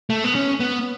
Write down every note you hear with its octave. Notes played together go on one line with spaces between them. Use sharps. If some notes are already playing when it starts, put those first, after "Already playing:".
A3
B3
C#4
B3